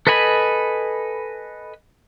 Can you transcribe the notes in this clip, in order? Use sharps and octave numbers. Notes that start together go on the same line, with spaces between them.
A4 B4 D#5 G#5 B5